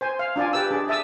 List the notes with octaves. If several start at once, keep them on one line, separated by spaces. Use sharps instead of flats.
C5 G#5
F5
D4 F4 D5 G#5
G4 B4 D5 E6
D4 G#4 D5
D5 E5 A5 D#6 E6